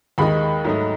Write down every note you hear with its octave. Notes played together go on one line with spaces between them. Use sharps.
D#2 D#3 G#3 D#4 B5
G#2 F#3 A3 D#4